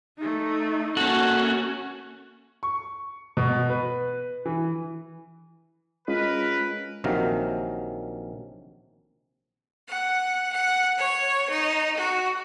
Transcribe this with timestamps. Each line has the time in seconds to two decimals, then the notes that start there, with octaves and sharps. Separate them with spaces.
0.17 A3 D#4
0.97 A#3 C#4 F#4 A4
2.63 C#6
3.37 B2
3.70 B4
4.46 E3
6.08 G#3 C#4 F4 A#4 B4
7.04 A#1 C3 D#3 F#3 F5
9.88 F#5
10.53 F#5
10.99 C#5
11.51 D#4
11.98 F#4